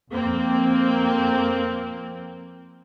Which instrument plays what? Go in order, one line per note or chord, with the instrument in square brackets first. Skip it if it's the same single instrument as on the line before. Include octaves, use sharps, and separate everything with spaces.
[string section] F2 A#3 C4